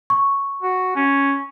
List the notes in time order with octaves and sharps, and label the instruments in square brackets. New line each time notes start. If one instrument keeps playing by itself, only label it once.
[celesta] C#6
[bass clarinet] F#4
C#4